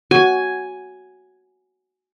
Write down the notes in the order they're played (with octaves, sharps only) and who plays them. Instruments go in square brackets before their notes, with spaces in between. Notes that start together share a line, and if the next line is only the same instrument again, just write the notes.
[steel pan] F#4 [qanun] G#5